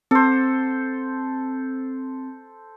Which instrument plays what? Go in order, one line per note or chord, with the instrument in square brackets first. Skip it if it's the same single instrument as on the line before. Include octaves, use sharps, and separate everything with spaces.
[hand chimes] C4 [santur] A4 C5